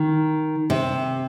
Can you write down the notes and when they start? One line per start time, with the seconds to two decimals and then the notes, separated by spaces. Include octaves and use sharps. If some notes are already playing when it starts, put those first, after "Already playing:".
Already playing: D#3
0.70 C3